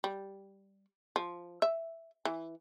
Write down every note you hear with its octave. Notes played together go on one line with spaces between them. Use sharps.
G3
F3
E5
E3